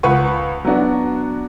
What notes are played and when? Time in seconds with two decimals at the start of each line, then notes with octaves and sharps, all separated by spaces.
0.03 C#2 B4 F#5 C#6
0.65 F#3 B3 D4 F#4